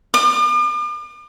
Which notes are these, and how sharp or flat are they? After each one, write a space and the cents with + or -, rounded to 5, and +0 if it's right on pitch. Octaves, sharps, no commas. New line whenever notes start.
D6 +45